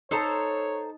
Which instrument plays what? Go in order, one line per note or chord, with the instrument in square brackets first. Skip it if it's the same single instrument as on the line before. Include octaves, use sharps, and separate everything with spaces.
[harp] D#4 A5 [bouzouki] A4 C5 A#5 [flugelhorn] C#5